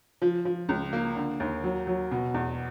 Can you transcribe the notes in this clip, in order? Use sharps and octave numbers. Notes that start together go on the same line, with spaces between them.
F3
F3
C#2
A#3
D3
D#2
F#3
F#3
B2
E2